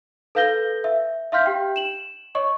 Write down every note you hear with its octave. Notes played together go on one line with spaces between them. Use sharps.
A4 B4 F5 G6 A#6 G7
E5
E5 F5 C6 F6 G6 B6
G4 G5
E7 F#7
C#5 D#5 C#6